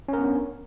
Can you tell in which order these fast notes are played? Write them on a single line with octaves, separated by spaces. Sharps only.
C#4 A#4 B3 D4